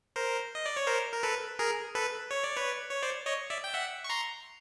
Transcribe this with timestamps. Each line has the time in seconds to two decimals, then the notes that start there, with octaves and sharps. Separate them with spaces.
0.16 A#4 C5
0.55 D#5
0.66 D5
0.77 C#5
0.87 A#4 C5
1.12 A#4
1.23 A4 B4
1.59 G#4 A#4
1.95 A4 B4
2.31 C#5
2.44 D5
2.57 B4 C#5
2.91 C#5
3.03 C5 D5
3.26 C#5 D#5
3.50 D5 E5
3.64 G5
3.74 E5 F#5
4.04 C#6
4.09 A#5 C6